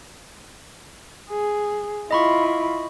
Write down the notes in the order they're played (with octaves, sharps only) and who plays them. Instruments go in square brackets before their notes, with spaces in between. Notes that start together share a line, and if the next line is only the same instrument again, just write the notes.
[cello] G#4
[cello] E4 F4 [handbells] D#5 B5 C#6